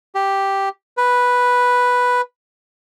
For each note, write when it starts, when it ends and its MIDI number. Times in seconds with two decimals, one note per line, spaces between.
0.15 0.69 67
0.97 2.21 71